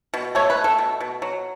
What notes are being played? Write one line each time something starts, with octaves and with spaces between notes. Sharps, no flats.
B2
A3 C#5
B4
A3
A4
B2
B2
F#3